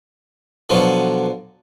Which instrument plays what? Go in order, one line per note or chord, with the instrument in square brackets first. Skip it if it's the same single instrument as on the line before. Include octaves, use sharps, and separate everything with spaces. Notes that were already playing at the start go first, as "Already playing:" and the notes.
[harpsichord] B2 D3 F3 F#3